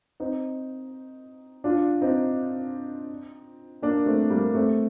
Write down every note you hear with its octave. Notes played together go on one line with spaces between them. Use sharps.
C4 D#4
D4 F4
C4 D#4
A#3 D4
A3 C4
G3 A#3
A3 C4